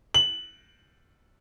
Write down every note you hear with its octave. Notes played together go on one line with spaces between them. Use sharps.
F#7